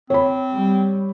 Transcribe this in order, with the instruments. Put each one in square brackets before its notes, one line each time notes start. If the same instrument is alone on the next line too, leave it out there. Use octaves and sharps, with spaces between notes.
[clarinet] C4 [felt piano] C#5 B5
[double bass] G3